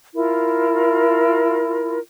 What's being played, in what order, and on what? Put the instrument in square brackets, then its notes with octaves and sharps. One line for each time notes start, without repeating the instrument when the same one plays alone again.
[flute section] E4 F4 A#4